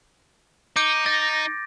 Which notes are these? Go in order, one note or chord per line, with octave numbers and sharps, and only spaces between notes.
D#4 D6 G6 D7
D#4 A6 A#6